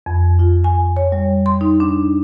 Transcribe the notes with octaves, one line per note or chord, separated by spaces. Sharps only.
F2
F4
G#5
C#5
G3
C6
D#4
D4